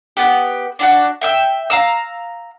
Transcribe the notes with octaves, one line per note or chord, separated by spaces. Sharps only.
B3 G4
D4 F4 F#4
E5 G5 E6
F5 A#5 E6